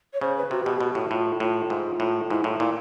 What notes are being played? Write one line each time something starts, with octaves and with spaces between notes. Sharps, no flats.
C#5
C#3 C5
B4
C3 F#4
B2 G4
G4
B2 F#4
A2
A2 F4
A2 F4
G#2
A2
G#2 E4
A2 F4
A#2 E4